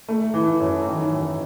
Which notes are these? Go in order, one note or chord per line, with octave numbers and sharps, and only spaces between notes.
A3
E3
F#2
D#3
F#2